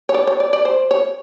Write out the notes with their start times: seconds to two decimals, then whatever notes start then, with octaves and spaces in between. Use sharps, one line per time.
0.09 C#5
0.14 D5
0.27 C#5
0.40 D5
0.53 D5
0.65 C5
0.91 C#5